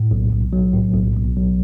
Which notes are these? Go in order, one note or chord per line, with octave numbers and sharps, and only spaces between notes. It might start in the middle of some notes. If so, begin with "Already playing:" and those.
Already playing: A2
B1
B1
F#3
A2
B1
B1
F#3